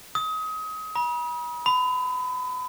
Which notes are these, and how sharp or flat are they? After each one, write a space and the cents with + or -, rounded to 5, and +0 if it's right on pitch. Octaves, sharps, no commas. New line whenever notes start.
D#6 +30
B5 -40
B5 +30